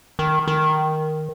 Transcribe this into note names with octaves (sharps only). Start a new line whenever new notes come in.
D#3
D#3